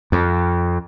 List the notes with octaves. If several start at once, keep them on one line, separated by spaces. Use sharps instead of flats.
F2